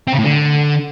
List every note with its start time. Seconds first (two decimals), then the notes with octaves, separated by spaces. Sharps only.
0.08 C4
0.13 C#3
0.19 A2
0.24 D3